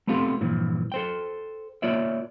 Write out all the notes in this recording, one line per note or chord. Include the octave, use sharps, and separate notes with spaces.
A3 B3 C4 F4 G4 A4
G2 A#2 E3 F3
A4 C5 G5
A#3 F4 C#5 D5 E5